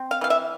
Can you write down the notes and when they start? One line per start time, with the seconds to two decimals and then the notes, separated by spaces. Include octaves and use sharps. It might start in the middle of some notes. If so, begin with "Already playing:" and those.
Already playing: C4
0.11 F5
0.21 E3 F5
0.30 E5